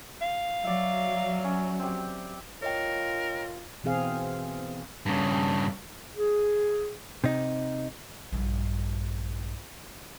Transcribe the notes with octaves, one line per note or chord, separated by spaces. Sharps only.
F5
F#3 D5 E5
C#4
C4 G4
F4 A#4 C#5 D#5 G5
B2 E3 C4 G#4 F5
G2 C#3
G#4
C3 D#4
A#1 G2